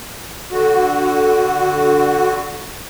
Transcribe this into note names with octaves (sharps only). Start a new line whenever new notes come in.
D3 F#4